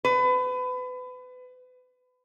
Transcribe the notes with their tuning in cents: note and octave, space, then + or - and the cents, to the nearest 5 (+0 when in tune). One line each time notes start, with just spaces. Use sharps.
B4 +30